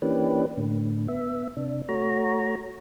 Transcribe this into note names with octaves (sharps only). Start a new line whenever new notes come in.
E3 A#3 C#4 D4 G4 B4
A2 D3
B3 E5
C3 D4
A3 F#4 C#5 A#5